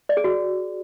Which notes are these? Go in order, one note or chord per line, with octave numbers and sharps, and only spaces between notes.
D5
G#4
F#4